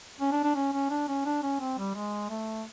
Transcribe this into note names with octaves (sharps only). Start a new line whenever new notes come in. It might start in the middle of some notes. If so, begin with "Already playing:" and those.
C#4
D4
D4
C#4
C#4
D4
C#4
D4
C#4
C4
G3
G#3
A3